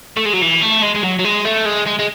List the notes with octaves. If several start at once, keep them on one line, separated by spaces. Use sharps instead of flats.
A3
G#3
F#3
E3
A3
G#3
G#3
F#3
F#3
G#3
A3
G#3
G#3
G#3